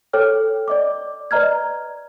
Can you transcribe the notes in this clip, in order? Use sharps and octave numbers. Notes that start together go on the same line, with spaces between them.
A4 C#5 G5 F6
D5 D#5 D6
B4 D5 D#5 A#5 F6 G#6